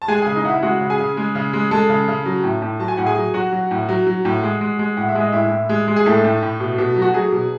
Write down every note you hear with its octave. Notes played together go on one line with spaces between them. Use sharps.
A5
G#3 G#4 G#5
C#3 G#4 G#5
D#4 D#5
C#3 E4 E5 F#5
G#3 F#4 F#5
C#3
G#4 G#5
C#3
G#3
C#3
G#3
G#3 A4 A5
C#3
C#3
F#3
A2
A2
F#3 A5
G#5
A2 F#5
G#4 G#5
F#3
F#3 F#4 F#5
F#3
A2
F#3
F#3
A2
G#3
G#3
G#3
A2 F#5
E5
G#3
D#5
A2 E4 E5
A2
G#3
G#3
G#4
A2 A3 A4
A2
A2
B2
B2
F#3
F#4
F#3 G#4
B2